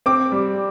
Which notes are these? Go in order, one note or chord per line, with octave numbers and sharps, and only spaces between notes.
C4 D6
G3